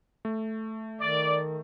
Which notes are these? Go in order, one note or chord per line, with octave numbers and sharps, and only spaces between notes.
A3
D#3 D5